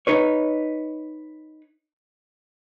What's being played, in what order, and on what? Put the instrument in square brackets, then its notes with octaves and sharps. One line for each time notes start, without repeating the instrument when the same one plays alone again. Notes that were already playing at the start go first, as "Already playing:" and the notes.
[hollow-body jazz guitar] D#4 B4 C#5